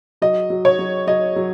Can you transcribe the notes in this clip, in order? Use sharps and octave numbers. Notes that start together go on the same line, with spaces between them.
F#3 D#5
F#3
C#5
F#3
F#3 D#5
F#3